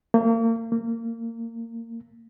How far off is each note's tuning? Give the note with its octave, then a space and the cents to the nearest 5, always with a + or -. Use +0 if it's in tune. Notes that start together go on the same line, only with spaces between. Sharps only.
A#3 -35
A#3 -25